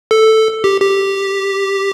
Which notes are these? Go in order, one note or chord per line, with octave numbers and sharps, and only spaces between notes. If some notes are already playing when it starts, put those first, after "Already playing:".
A4
G4
G4